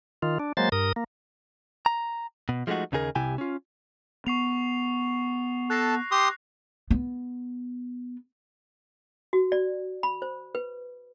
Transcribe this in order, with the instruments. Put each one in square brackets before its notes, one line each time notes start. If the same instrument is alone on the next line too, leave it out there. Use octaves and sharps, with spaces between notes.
[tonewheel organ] D#3 F4
D4
F#3 G#3 A#3 C5 A6
G2 A#4 D#6
A#3
[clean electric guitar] A#5
B2
F3 G#3 A3 D4 D#4 F#4
D#2 C#3 D#4 G#4 A#4
C2 C3 E4 G4 G5 G#5
C#4 F4
[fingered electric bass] B3 [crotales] C#6 C7 F7
[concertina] A4 A5 [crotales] F#6 A#6 C7
[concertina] G4 C6 D#6
[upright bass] B3
[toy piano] F#4
D5
B5
C5
B4